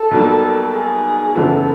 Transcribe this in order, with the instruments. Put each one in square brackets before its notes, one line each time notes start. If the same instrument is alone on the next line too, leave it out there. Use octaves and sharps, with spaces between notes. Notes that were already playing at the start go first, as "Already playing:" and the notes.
Already playing: [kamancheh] A4
[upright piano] B1 B2 G3 A#3
[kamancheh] G#4
[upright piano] F#1 E2 C#3 E3 G#3 [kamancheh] A4